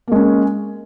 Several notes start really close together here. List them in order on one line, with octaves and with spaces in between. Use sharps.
A#3 G#3 C#4